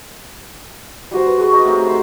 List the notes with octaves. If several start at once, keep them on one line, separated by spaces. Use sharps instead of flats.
G3 F#4 C5
B4
F#4 G#4 C#6
D#4 F#5 A#5
A2 C3
C5 B5